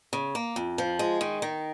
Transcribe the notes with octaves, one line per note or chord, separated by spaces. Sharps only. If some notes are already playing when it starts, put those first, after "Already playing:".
C#3
A#3
F2
F3
G#3
D#3
D#3